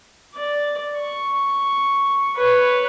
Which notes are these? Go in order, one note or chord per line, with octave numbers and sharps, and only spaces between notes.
D5
C#6
B4 C#5